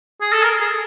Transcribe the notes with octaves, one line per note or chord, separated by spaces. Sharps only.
G#4
A4
A#4
G#4